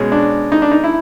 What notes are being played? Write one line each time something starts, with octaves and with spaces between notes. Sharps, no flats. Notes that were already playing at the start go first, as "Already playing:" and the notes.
Already playing: B2 G#3 C#4
D4
D#4
D4
D#4
E4